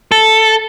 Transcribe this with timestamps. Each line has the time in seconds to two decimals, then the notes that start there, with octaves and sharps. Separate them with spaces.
0.12 A4